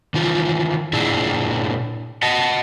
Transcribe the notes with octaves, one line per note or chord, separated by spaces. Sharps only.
D#3 E3 F4
A#2 D4 E4 G#4
D#5 F#5 A5